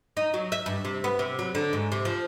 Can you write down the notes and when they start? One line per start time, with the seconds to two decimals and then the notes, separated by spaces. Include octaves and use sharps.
0.17 D#4
0.34 F#3
0.52 E5
0.66 G2
0.85 C3
1.04 B3
1.19 C3
1.39 F#3
1.55 D3
1.73 G#2
1.92 C3
2.05 F3